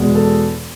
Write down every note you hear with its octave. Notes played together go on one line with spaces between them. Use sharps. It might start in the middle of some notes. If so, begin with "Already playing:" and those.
Already playing: E2 B2 G#3
A4